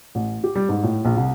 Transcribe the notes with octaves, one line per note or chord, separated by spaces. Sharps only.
A1
G4
G3
G#2
A2
A#1
C2